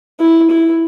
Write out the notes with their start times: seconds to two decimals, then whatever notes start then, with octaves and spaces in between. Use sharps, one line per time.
0.20 E4
0.50 E4